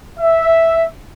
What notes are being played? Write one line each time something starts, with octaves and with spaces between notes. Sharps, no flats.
E5